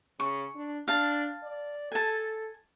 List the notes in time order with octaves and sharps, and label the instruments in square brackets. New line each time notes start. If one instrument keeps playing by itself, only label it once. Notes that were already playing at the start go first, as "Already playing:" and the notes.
[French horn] C#3 [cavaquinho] C#6
[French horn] D4
[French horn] D4 [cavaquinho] F5 A5
[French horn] D5
[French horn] A4 [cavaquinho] G#5 A5